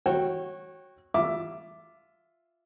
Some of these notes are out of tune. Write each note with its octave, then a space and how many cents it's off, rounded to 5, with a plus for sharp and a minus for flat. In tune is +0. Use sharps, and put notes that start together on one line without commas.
F#4 +0 C#5 -20 G5 +0
F4 +0 E5 +10 D6 +0